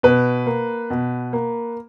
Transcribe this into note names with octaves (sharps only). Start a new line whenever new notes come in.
B2 B4
A#3
B2
A#3